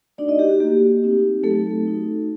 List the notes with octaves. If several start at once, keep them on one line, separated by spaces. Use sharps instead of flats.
A3 D4 D#4 F#4 D5
D#4 D#5
G4
F#4
A#3 F#4 G4
A3 C4 D#4 F#4
F#3 A3 C4 D#4 A4
A3 D#4 F#4